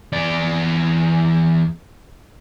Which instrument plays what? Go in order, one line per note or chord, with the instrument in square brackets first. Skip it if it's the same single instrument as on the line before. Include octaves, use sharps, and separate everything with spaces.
[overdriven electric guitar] E2 D5